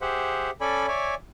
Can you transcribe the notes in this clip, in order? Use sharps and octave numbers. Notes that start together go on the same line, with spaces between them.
G4 G#4 C5 E5 F#5
C#4 A4 D5 G#5 B5
C#5 D5 E5 G#5